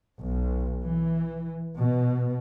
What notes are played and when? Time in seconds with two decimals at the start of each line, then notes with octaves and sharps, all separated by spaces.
0.18 B1
0.84 E3
1.76 B2